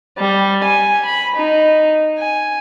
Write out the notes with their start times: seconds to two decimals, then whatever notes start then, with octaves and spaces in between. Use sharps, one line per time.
0.18 G3
0.63 G#5
1.06 B5
1.35 D#4
2.19 G#5